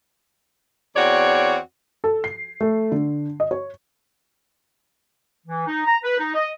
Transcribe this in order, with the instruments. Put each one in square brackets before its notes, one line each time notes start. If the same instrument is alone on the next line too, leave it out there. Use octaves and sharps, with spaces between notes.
[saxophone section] E2 C4 F#4 C#5 D5
[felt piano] A4
C7
A3
D3
D#5
C#5
[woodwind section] E3
D#4
A#5
B4
D#4
D#5